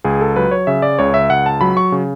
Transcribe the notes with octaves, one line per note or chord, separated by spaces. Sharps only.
C#2 G#4
A4
F#3 B4
C#5
C#3 E5
D5
C#2 C#5
E5
C#2 F#5
A5
F#3 B5
C#6
C#3